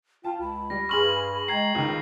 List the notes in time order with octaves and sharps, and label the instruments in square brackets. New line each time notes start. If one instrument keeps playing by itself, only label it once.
[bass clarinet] F4 [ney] G5 [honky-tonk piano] A5
[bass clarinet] C#2 [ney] B5
[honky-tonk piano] G3 [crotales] A#6
[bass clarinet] G2 [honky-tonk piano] G#4 C6 F6 [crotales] C#6 F#7
[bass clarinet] G#3 [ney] G5 [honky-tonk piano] A#5 [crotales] G#6 C7
[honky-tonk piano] C#2 D#3 [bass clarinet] D#4